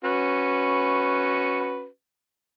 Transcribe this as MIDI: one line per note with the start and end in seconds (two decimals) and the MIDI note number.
0.04 1.86 61
0.04 1.86 66
0.04 1.86 71